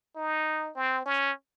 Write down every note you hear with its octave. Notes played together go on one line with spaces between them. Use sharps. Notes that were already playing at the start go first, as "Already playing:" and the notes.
D#4
C4
C#4